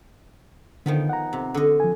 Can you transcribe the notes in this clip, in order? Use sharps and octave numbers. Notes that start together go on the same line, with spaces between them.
D3 D#3 F3 B3
F#5 A#5
C3
D3 D#5
F3 G#5